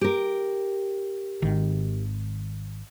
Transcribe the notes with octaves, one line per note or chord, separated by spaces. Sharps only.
G4 A#4
G#1 D#3